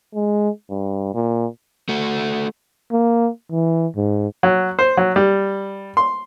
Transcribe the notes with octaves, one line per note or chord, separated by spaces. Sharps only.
G#3
G2
A#2
A3 F#4
A#3
E3
G#2
F#3
C5
F#3
G3
C6